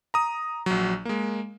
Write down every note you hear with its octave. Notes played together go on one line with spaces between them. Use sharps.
A#5 D#6
A#1 F#3
G#3 A#3